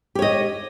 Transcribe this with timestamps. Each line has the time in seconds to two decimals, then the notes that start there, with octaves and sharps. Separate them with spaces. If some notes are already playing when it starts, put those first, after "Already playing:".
0.15 G4
0.19 C#5
0.22 D#5